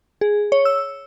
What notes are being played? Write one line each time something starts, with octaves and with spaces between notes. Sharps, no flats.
G#4
C#5
E6